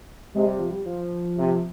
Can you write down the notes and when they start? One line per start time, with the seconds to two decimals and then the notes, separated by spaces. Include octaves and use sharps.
0.34 C3 G#3
0.47 G3
0.59 F3
0.71 G3
0.86 F3
1.37 C3